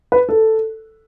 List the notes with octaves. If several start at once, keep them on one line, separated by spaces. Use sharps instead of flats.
B4
A4